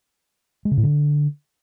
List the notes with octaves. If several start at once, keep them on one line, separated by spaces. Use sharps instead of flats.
G#3
C#3
A2
D3